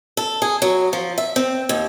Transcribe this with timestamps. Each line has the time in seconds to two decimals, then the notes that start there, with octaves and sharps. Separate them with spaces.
0.17 A4
0.42 G#4
0.62 F#3
0.93 F3
1.18 E5
1.36 C4
1.69 D#2